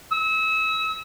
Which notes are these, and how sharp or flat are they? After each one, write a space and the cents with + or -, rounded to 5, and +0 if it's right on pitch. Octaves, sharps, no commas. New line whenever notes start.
E6 -35